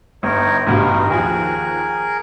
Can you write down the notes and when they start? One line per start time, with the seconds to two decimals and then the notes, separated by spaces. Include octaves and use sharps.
0.23 G1 D#4 A#4 C#5
0.67 A1 G2 B2 D#4 A#4
1.09 D#2 F3 G#4 A#4